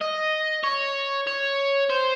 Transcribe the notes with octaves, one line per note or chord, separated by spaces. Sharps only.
D#5
C#5
C#5
C5